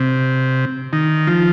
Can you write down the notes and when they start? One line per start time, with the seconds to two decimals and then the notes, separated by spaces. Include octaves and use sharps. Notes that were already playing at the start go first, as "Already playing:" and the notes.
Already playing: C3
0.93 D#3
1.27 F3